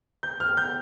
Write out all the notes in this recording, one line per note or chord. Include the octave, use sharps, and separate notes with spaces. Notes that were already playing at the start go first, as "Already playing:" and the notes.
G6
F6
G6